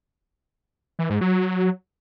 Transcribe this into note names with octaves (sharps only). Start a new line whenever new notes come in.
E3
G#2
F#3